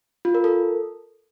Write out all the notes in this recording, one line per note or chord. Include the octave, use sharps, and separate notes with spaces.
F4
A#4
A4